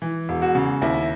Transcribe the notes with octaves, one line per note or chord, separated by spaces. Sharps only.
E3
E1
F#4
C#3
D#2 E4